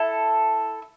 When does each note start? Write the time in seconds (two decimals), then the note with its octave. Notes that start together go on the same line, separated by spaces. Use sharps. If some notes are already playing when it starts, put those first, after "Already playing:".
Already playing: E4 A4